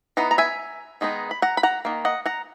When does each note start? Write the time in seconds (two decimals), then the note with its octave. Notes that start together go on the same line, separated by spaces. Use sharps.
0.17 E3 B3 D#4 F#5 A#5
0.31 A#5
0.38 E5 G#5
1.01 D#3 G#3 B3 D#4
1.31 B5
1.42 F#5 A#5
1.57 B5
1.63 F#5 A#5
1.85 D#3 A#3
2.05 D#5 F#5
2.26 F#5 A#5